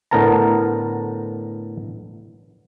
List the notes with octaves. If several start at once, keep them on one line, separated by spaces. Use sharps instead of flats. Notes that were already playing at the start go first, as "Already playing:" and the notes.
A2 D3 B3 A#4 A5 A#5